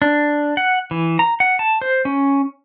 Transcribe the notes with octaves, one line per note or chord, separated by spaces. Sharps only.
D4
F#5
E3
A#5
F#5
A5
C5
C#4